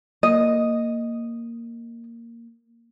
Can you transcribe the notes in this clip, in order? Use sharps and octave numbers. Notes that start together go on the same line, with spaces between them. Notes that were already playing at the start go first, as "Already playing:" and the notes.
A#3 D#5